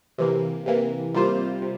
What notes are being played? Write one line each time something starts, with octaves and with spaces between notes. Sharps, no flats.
C3 E3 A#3
C3 E3 A#3
C3 G3 A#3 F4 C5
C3